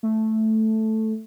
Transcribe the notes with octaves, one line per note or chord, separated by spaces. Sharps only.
A3